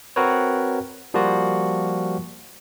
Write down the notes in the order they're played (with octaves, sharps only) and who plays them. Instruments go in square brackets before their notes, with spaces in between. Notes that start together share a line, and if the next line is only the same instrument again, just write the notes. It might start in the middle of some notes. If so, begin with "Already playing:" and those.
[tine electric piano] C4 F#4 A#4 B4 C#5
F3 G3 A#3 F4 F#4